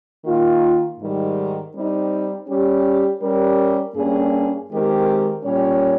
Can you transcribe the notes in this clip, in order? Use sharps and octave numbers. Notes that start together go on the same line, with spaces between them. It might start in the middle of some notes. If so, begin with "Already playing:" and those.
D#3 A#3 F4
G#2 D#3 G3
G3 C4 D#4
G3 C#4 G4
G3 C#4 G4 A#4
G2 G3 A#3 C#4 G#4
D#3 G#3 C4 G4 A#4
A#2 G3 C#4 G4 C#5